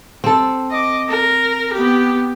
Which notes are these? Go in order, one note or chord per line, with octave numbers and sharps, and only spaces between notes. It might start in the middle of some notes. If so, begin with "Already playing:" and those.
C4 A4
D#5 D6
A#4
B3 G4